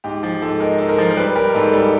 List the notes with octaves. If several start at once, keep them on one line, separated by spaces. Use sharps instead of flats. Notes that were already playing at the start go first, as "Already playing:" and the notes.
G#2 G4
F3 G4
G#2 A4
G#3 A#4
G#2 A4
A#4
F3
A#4
G3 B4
G3 A#4
G#2 A4
G3 A4